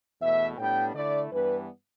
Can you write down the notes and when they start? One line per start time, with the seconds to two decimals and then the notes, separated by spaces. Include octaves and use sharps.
0.20 E2 B2 A3 E5
0.57 A2 G3 B3 D4 G5
0.94 D3 A3 E4 D5
1.31 G2 E3 G3 B3 D4 B4